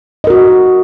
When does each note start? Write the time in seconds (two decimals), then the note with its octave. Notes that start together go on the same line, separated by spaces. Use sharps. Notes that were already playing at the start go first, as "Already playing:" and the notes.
0.24 D#5
0.27 A#4
0.30 F#4